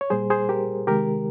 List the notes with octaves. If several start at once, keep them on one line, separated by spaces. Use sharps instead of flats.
C#5
A#2 G3 G#4 C5
G#4 C5
G4 A#4
C3 D#3 G#3 G4 A#4